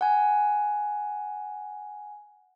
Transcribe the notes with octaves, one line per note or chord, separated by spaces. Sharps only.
F#5 G#5